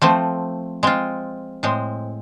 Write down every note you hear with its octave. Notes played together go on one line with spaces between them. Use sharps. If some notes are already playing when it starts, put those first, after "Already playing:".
F3 A3 C4
G#3 C4 F4
A2 G#3 C4